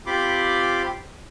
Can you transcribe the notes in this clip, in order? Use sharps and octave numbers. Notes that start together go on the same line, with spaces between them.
C4 F4 G4 B5 C6 D6